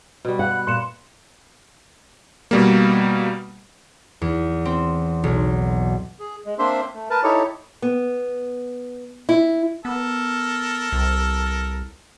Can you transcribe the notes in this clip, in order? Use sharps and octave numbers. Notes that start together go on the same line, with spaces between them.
B2 G3
F#5 F#6
B5
A#2 C6 C#7 E7
B2 G3 A#3
E2
C4
B1
G#4
G#3
A#3 C4 D4 C5 E5 C6
A3
A#4 B4 A5
D#4 E4 G4 A4 C#5
B3
E4
B3 A4 A#4
C2